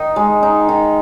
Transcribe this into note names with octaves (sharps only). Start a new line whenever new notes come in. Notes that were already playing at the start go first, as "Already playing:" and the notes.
Already playing: D#3 D#4
G#3
D#4
D#3